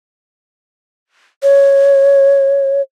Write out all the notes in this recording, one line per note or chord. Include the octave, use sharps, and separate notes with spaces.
C#5